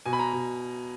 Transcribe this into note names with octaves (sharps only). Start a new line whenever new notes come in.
B2 G#5
B5
A#5
B2